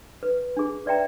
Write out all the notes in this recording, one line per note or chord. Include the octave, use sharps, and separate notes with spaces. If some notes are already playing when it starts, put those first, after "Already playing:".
B4
D4 G#4
B4 D5 E5 G5 A#5